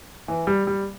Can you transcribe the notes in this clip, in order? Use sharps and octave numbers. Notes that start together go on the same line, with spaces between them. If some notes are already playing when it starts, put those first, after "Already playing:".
E3
G3
G3